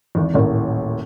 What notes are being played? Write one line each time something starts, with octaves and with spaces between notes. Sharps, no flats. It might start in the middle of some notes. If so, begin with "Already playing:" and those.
G#1 E2
D#1 A1 A2 A#4